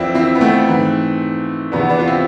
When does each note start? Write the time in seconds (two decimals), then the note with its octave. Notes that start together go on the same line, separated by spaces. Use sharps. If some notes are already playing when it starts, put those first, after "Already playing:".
Already playing: F2 E3 C4 D4 E4 F4
0.15 C4 E4
0.35 B3
0.41 A3 C4
0.68 G#2 E3
1.72 E2 C3 E3 B3 D4
1.89 B3 D4
2.00 F4
2.07 C4 E4